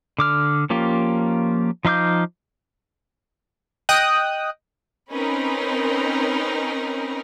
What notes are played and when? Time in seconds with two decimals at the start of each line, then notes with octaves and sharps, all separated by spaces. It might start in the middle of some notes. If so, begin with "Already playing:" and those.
0.19 D3 D6 F6
0.70 F3 A#3 C#4 F4 G4
1.85 F3 D#4 F5 D6 G6
3.89 D#5 G5 D#6 F#6
5.10 C4 C#4 D#4 A#4 B4